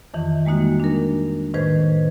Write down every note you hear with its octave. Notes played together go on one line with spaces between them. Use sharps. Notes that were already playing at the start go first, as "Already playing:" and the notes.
F2 D#3 E3
G3 G#3 A#3 D#4 F#4
D4 A#4
A2 D#3 B4 C5 G#6